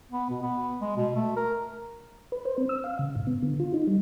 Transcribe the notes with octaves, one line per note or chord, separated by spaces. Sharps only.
B3
B2
B3
G#3
B2
A3
A#4
B4
C5
C4
E6
F5
C#3
G#2
B3
D3
F4
D#4
G3